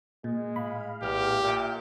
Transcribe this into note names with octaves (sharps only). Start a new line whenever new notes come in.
A#2 G#3
A2 F5 B5
A#1 E2 G4 F6
A#2 E5 G5